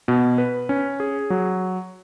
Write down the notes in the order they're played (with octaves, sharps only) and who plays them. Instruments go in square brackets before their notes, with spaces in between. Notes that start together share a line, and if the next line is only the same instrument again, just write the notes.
[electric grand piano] B2
B4
C#4
G#4
F#3